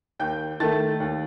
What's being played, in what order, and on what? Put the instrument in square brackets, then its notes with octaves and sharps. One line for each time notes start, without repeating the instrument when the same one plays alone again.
[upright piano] D#2 G5 G6
D#3 A3 A5 A6
D#2